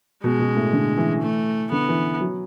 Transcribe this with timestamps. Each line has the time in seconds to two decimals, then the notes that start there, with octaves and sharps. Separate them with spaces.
0.24 B2 G#3
0.39 B2
0.56 A2
0.73 D3
0.97 E3
1.22 A3
1.72 D3 B3
1.89 E3
2.21 F#3